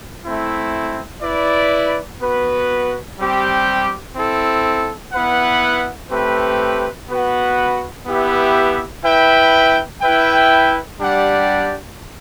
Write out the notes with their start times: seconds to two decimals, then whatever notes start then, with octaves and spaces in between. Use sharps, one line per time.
0.24 A3 C4 E4
1.22 E4 B4 D5
2.20 B3 F#4 B4
3.17 G3 C4 G4
4.15 C4 E4 A4
5.13 B3 E4 B4 F#5
6.10 A3 C4 G4 B4
7.08 B3 F#4 B4 F#5
8.05 B3 E4 G4 B4 E5
9.03 E4 B4 E5 G5
10.01 E4 B4 E5 G5
10.99 G3 D4 G4 D5 F#5